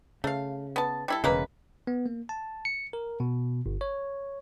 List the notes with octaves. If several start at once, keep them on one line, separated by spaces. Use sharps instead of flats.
C#3 A3 F5
B3 A5
G3 E4 A4
E1 C#3 G#3 A#3 B4
B3
A#3
A5
C#7
A#4
B2
G1
C#5